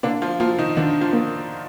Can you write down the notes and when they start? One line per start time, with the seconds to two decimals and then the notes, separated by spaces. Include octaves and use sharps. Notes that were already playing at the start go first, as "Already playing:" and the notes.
0.03 D3 A#3 D4
0.22 F3 F4
0.40 F3 A#3 F4
0.58 D#3 D#4
0.77 D3 D#3 D4
1.01 F3 F4
1.13 A#3